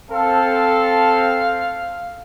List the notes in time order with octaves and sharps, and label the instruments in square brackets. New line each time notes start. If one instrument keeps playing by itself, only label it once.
[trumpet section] C4 A4 [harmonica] F5